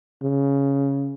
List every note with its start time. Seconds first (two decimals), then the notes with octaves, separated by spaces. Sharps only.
0.23 C#3